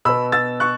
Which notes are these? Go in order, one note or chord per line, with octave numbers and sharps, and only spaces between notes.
B2 B3 B5 E6
E6 A6
C#6 F#6